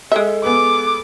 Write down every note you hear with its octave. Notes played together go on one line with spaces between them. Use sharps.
G#3 A4 E5
B3 G#4 B4 D6